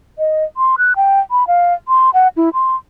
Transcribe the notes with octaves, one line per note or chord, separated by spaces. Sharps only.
D#5
C6
F#6
G5
B5
F5
C6
F#5
E4
C6